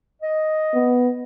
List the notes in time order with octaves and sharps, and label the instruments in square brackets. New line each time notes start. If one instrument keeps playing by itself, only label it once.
[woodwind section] D#5
[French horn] B3